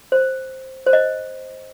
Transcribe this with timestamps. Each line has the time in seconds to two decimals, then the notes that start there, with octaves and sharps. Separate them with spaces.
0.12 C5
0.86 C5
0.93 D#5